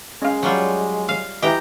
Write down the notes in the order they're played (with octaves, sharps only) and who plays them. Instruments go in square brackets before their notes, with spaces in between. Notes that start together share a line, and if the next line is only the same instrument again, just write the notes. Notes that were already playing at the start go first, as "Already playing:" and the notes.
[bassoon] G#3 [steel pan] C#4 F5
[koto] F#3 G3 F4
F5
[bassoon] E3 [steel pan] E4 D#5 [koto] G4 G5 A#5